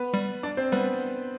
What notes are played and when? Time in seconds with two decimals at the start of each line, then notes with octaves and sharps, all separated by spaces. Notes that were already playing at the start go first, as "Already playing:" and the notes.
Already playing: B3 B4
0.14 G3
0.43 D4 D5
0.57 C4 C5
0.72 G3 B3 B4